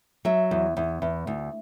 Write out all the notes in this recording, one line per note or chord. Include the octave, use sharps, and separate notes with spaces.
F#3 E5
E2
E2
E2
D2